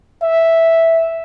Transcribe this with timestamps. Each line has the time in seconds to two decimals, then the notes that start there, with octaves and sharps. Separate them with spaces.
0.23 E5